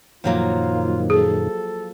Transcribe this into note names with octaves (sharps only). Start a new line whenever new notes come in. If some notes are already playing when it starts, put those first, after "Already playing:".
F#2 A#2 D#3 F3 F#3 A#3 F4
G#4 A4